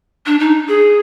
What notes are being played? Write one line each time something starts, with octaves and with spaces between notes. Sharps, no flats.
D4
D#4
G#4